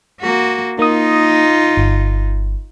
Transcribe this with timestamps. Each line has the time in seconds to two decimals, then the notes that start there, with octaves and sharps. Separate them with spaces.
0.21 A#3 F#4
0.79 A#3 D#4 F4 D#6
1.77 G1